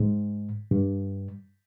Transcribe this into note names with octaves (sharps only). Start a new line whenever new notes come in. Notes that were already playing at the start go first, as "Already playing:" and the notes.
Already playing: G#2
G2